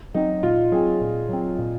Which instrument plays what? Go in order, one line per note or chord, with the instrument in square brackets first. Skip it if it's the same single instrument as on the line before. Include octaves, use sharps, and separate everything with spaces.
[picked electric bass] F#3 C4 [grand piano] D#4
[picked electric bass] A#2 [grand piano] F4
[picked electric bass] F#3 C4 [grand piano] G#4
[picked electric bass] A#2
F#3 C4
A#2